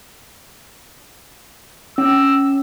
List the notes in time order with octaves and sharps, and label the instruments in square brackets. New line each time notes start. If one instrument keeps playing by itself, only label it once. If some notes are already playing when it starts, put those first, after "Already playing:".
[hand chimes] C#4 [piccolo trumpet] E6